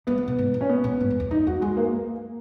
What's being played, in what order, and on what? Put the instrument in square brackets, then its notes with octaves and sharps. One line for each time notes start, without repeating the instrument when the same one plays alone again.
[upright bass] F#3 [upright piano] B3
[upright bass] E3
B2
G#2
A#2
[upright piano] C#4
B3
[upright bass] A#2
G#2
F#2
E2
[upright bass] F#2 [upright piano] D#4
[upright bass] E2 [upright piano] F#4
[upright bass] F#2 [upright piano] G#3
[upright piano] A#3
A#3